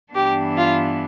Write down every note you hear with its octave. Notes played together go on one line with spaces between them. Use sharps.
G2 E3 B3 D4 G4
F4